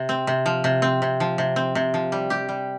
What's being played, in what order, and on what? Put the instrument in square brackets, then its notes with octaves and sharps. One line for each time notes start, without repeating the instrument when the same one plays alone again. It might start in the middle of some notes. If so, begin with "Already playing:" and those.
Already playing: [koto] C3
C4
C3
F3
C3
C4
C3
F3
C3
C4
C3
F3
G3
G4
G3